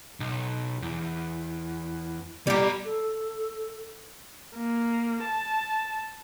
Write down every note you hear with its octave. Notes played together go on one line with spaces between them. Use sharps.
B1
E2
G3 B3 G4 A#5
A4
A#3
A5